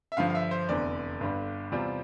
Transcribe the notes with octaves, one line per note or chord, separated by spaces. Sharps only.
E5
G2 D3 F3 F5
F5
E5
C5
F1 E2 D3 D5
G1 G2 D3 G3
E2 C3 G3 C4 F4 D5